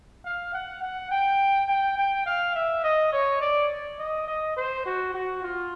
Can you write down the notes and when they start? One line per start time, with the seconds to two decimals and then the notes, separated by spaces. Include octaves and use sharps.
0.25 F5
0.53 F#5
0.82 F#5
1.11 G5
1.68 G5
1.98 G5
2.26 F5
2.55 E5
2.84 D#5
3.12 C#5
3.41 D5
3.99 D#5
4.28 D#5
4.57 C5
4.86 F#4
5.14 F#4
5.43 F4